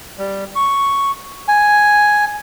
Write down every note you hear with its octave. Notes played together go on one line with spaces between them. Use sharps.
G3
C#6
G#5